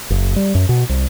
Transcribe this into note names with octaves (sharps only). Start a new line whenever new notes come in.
F#1
G3
F#2
B2
C2